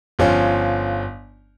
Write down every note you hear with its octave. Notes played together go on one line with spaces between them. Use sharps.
G1 F3 C#4